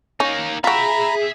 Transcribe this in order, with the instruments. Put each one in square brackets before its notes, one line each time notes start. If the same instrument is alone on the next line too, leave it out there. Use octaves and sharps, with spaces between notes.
[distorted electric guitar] A#3 D#4 [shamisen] C#4
[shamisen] F4 F#4 [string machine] G#4 [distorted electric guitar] E5 G5 [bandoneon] A#5 B5